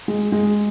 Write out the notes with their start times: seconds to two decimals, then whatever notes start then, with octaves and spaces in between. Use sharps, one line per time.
0.08 G#3
0.32 G#3